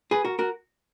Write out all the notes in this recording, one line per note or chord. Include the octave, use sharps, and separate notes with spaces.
G#4 B4
F#4 A#4
F#4 A#4